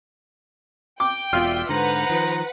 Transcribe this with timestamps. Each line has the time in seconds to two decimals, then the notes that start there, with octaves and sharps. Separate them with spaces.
1.00 G5 D6
1.33 E1 B2 F4 D5 E5
1.69 G#2 D3 B4 C5 F#5 A#5
2.09 D#3 F3